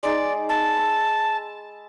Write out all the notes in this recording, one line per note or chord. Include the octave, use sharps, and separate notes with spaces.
G#3 D#4 G#4 D5
A5 E6
B5 D6 E6